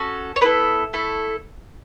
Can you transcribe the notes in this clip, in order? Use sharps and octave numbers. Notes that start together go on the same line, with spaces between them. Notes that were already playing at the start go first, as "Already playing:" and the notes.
Already playing: C#4 F#4 A4
C#5
B3 E4 A4 B4
A3 E4 A4